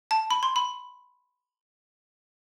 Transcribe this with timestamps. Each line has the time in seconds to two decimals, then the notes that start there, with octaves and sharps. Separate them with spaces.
0.11 A5
0.31 B5
0.43 C6
0.56 B5